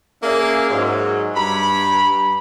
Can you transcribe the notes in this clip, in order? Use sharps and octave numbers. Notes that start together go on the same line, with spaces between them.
A#3 C#4 G#4 D5 E5 F5
G#2 F#3
G2 A#5 B5